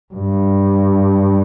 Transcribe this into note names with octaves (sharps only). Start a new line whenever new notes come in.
G2